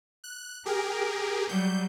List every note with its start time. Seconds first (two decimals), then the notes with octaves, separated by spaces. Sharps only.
0.24 F#6
0.66 G4 G#4 A#4
1.49 F#3 G3 G6